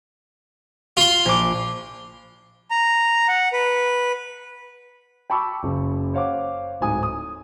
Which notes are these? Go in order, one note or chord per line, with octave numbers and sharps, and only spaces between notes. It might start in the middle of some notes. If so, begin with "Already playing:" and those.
F4 C6
A#1 D6
A#5
F#5
B4
G5 A5 B5 C#6 D6 E6
F#1 C#3
C5 C#5 F5 F#5 D6
D1 G#2 G#5 D#6
D#6